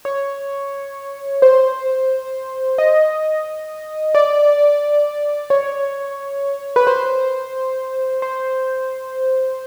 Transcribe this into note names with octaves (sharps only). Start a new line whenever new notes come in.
C#5
C5
D#5
D5
C#5
B4
C5
C5